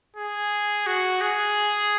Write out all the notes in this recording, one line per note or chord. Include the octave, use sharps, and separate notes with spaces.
G#4
F#4
G#4